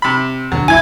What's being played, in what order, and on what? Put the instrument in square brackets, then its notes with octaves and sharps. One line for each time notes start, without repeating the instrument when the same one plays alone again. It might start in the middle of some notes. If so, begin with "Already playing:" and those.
[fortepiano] C3 B5
[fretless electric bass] E2 B2 D3 [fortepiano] F#3
[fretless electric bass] C2 F#2 [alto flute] E4 [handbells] G#5 G#6